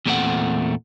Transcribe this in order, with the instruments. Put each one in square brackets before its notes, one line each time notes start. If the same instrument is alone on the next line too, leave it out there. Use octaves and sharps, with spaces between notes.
[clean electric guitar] E2 A#2 G3 A3 C4 F#5